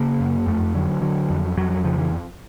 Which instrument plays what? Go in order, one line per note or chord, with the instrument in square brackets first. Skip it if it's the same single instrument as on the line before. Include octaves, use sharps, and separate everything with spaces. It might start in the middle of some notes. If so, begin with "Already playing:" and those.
Already playing: [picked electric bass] C#3 A#3
F#2
F2 A3
D3 F#3
D3 F#3
F2
F2 F#3
F#3
C#3 F3
E3